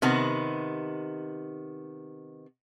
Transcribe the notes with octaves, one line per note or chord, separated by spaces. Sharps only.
C3 D#3 B3